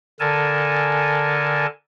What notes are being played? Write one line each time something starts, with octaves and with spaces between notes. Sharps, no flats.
D3 A4 A#4 G#5 A5